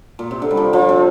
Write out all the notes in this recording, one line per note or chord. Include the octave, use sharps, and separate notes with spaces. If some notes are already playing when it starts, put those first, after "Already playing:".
A#2
C3
D3
G3
F3
F3
C3